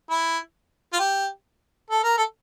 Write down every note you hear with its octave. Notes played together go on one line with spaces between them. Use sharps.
E4
F4
G4
A4
A#4
A4